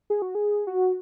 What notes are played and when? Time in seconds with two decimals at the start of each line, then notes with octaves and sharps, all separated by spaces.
0.10 G#4
0.22 F#4
0.35 G#4
0.67 F#4